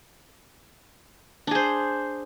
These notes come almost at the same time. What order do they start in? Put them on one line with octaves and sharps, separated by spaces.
D4 G#4 C5